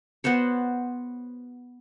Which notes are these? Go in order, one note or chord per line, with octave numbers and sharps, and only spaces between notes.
B3 F#4 C5 C#5